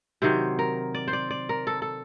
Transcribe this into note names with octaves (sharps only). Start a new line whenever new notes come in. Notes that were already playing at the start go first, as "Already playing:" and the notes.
C3 D#3 F#3 C5
A#4
D5
C5
D5
D5
A#4
A4
A4